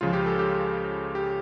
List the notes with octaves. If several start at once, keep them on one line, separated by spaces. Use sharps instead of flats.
C#2 C#3 F3 F4
G4
A4
G4
G4